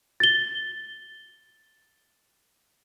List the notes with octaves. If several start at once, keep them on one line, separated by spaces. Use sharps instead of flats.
A6 G7